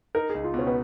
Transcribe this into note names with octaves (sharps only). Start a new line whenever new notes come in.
D#4 A#4
C#2 G#4
F4
B2
C#4
B3